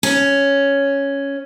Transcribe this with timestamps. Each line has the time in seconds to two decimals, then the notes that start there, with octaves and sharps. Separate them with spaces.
0.03 C#4